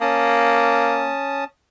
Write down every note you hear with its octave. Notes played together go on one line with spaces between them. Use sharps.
A#3 C#4 A5 D#6